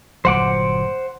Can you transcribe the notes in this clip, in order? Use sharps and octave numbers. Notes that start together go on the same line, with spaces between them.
G1 A#2 F#3 C5 F#5 D6